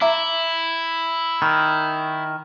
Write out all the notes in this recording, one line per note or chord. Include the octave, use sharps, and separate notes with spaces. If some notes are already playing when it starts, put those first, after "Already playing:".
E4 E5 A#5 D6
D#3 B5